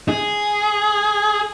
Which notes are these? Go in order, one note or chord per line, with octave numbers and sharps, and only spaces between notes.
G#4